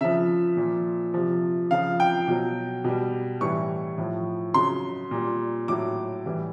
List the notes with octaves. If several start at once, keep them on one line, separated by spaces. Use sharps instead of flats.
C#3 F3 E5
A#2 F3
C3 F3
C#3 F3 F5
G5
B2 F#3
B2 G3
A2 E3 G3 C#6
A2 F3
C#3 F#3 C6
A#2 G3
A2 F#3 D6
A2 E3 G3